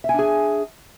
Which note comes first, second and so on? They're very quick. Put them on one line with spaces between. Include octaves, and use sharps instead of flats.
E5 G#5 D4 G#4